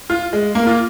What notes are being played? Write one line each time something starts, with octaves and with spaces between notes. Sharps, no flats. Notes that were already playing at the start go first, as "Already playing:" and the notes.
F4
G#3
A#3
F4